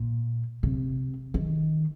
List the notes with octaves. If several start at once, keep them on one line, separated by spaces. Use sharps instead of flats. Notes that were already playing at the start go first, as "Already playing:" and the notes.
Already playing: A#2
C3
D#3